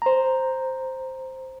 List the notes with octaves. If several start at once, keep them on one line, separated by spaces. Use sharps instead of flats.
C5 A#5